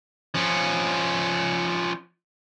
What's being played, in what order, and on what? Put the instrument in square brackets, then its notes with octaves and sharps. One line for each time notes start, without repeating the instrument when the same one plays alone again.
[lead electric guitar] F3 C#4